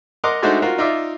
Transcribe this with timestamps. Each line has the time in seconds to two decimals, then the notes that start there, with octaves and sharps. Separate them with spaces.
0.24 A#4 D#5 F#5 A#5 C6 D6
0.42 G#3 A3 D4 D#4 F#4 C5
0.62 F4 F#4 A#4
0.78 D#4 F4 D5 E5